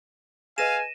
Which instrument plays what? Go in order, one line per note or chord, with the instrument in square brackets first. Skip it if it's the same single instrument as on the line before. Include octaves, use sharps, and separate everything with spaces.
[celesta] G#4 B4 D#5 [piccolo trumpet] F5 [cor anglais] G#5 [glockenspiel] A#6 D#7 E7